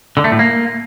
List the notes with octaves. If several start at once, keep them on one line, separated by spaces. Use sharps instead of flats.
D3
A3
A2
A#3